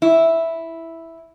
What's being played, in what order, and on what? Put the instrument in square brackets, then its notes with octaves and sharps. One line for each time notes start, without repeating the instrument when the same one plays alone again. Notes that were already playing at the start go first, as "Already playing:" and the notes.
[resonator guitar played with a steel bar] E4